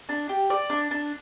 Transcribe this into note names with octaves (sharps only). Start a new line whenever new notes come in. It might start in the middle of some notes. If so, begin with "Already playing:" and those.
D4
G4
D5
D4
D4